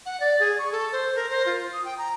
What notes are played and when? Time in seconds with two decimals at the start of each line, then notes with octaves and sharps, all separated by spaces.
0.06 F#5
0.20 D5
0.40 G#4
0.59 C#6
0.72 A4
0.92 C5
1.16 A#4
1.30 C5
1.46 F4
1.73 D#6
1.85 G5
1.98 A#5